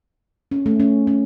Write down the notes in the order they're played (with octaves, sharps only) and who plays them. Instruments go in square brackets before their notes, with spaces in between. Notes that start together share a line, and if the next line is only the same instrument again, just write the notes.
[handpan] C#4
A3
C#4
C#4